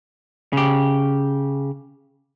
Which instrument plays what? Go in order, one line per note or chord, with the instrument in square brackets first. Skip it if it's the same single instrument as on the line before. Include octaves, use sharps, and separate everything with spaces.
[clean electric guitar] C#3 G4